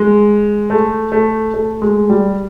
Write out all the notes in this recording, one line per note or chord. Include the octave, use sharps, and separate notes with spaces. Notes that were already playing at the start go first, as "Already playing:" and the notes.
Already playing: G#3
A3
A3
A3
G#3
G3